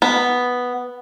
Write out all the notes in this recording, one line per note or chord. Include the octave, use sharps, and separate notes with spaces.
B3